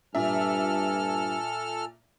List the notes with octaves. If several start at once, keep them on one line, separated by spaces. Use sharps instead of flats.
G2 A#2 A4 E5 G#5 F6